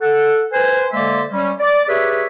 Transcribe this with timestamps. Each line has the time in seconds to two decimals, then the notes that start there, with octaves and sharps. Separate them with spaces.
0.01 A4 F#5
0.52 B4 C5 G#5
0.92 D3 G#3 A#3 D5 E5 C6
1.33 G3 C#4
1.60 D5
1.88 G4 G#4 B4 C#5 E5